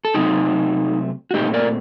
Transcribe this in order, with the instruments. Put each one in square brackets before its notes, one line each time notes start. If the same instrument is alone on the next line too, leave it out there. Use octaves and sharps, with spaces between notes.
[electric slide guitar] A4
C3 F#3 A3 C4 D#4 G4
F#4
A#2 A3 C4 D#4 G4
A#4 D5